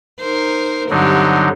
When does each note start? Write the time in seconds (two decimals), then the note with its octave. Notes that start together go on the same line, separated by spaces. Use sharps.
0.20 D#4 A#4 C5
0.90 G2 D3 F#3 C4 D#4 G4